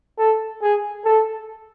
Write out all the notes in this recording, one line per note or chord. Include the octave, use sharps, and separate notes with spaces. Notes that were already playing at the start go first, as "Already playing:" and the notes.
A4
G#4
A4